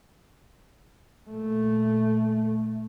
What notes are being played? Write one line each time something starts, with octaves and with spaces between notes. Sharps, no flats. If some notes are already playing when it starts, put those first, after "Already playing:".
A#2 A3